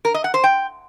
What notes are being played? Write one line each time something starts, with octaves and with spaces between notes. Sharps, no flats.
A#4
D#5
F#5
C5
G5